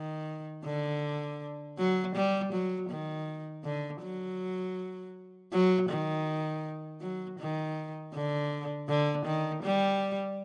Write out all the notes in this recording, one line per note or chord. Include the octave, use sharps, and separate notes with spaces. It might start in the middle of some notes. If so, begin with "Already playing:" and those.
Already playing: D#3
D3
F#3
G3
F#3
D#3
D3
F#3
F#3
D#3
F#3
D#3
D3
D3
D#3
G3